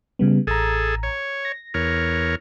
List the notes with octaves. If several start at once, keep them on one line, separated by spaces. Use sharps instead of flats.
C#3 G3 B3
A1 G#4 A4 A#5
C#5
A#6
E2 A#4 C#5